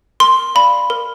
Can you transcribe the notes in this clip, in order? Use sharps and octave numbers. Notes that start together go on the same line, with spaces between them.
A#4 C6
D5 F5 B5
A#4